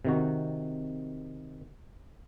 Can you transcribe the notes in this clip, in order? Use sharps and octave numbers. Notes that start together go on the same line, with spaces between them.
C3 D#3 F#4